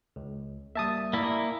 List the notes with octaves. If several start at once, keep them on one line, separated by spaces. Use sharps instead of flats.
C#2
G3 A#3 E5 A5 D#6
A#3 E4 D5 G#5 B6